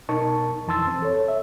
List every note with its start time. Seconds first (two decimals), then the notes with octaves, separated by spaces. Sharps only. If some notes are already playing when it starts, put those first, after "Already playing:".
0.09 B2 D#4 A#4 A5 C#6
0.67 F2 E3 A5 C6 E6 A6
0.87 C4
1.02 A4 C#5
1.28 E5